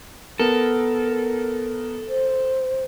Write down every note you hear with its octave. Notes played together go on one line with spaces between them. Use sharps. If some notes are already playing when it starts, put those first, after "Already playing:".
B3 A4 A#4
C5